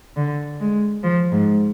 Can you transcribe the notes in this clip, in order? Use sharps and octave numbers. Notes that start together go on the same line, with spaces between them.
D3
G#3
F3
G#2